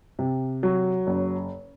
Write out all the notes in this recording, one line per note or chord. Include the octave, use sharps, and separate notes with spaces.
C3
F#3
F#1